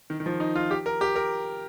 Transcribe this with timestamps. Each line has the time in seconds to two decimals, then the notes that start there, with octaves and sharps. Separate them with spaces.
0.10 D#3
0.20 D#3
0.26 F3
0.40 D#4
0.56 F4
0.71 G4
0.86 A#4
1.01 G4
1.15 A#4